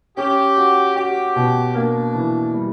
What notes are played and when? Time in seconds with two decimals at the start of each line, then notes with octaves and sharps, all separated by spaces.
0.17 C#4 G4
0.57 F#4
0.96 F#4 G4
1.36 B2
1.75 A#3 D4
2.15 E3
2.54 G3